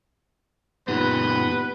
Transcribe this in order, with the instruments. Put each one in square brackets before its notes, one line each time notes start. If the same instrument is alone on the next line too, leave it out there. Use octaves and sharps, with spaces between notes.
[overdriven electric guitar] F#2 A#2 [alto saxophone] B3 [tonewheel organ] D#4 G4 [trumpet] B4